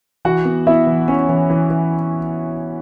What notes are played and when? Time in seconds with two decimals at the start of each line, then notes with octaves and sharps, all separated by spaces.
0.25 E3 F#4 F#5
0.45 B3
0.67 B3 E4 E5
0.87 E3
1.08 E3 C#4 C#5
1.29 E3
1.50 E3
1.70 E3